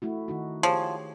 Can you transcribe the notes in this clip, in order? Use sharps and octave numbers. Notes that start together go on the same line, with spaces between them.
A3 E4 F#4
D#3 D#4 F#4
F3 G4 G#4 C#5